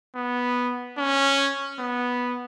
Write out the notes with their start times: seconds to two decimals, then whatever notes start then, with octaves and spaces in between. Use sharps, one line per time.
0.16 B3
0.98 C#4
1.80 B3